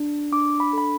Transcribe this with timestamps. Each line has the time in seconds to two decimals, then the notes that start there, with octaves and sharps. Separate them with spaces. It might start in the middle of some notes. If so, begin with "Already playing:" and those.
Already playing: D4
0.32 D4 D6
0.60 B5
0.73 A4 B5